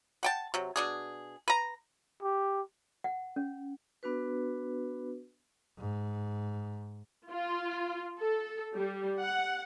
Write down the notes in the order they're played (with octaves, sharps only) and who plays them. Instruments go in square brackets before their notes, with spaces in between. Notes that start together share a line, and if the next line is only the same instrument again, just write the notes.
[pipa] F#5 G5 A5
C3 F#3
B2 D4 G#4
B4 A#5
[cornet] G4
[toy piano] F#5
C#4
[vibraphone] B3 D4 F#4 B4
[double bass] G#2
[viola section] F4
A4
G3
F#5